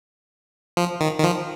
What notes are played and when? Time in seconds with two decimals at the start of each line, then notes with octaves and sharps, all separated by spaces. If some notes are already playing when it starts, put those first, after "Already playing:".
0.77 F3
1.01 D#3
1.18 D#3
1.24 F3